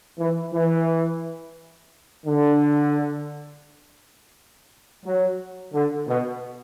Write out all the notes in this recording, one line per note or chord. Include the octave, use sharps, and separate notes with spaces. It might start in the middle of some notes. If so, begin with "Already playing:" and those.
E3
E3
D3
F#3
D3
B2